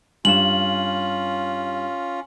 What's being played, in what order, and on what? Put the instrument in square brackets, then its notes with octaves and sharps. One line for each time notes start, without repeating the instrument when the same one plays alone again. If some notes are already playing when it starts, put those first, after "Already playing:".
[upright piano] G2 E7 [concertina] C#4 F4 [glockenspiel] F#7